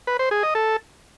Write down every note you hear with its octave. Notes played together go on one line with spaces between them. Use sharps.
B4
C5
G#4
D#5
A4